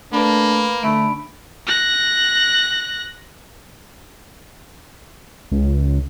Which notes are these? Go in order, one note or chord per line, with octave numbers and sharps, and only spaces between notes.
A3 A#3 D4 B4 B5
D3 A3 D4 B5 D7
F#6 A#6
C#2